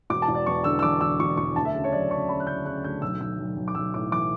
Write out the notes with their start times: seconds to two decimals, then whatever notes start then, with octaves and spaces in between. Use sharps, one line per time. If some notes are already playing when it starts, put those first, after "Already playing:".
0.10 E1 D6
0.22 A5
0.28 E1
0.35 D5
0.46 E2 C#6
0.64 D3 E6
0.79 E6
0.83 E2 D6
1.01 E1 E6
1.20 E1 C#6
1.37 E1 C#6
1.56 D2 A5
1.65 E5
1.75 C#3
1.84 C#5
1.92 F#3 D5
2.11 C#3 C#6
2.29 C#3 B5
2.40 F#6
2.47 C#3 G6
2.66 C#3 F#6
2.84 D2 G6
3.02 B1 E6
3.20 B1 E6
3.39 B1
3.56 B1
3.68 D6
3.75 B1 E6
3.94 A2 D6
4.11 E3 D6